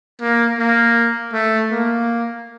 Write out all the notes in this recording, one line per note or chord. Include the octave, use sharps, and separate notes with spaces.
A#3
A#3
A3
A#3